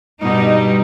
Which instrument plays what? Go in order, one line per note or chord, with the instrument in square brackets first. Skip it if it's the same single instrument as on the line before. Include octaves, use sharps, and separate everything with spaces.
[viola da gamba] G2 B2 [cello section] G3 D#4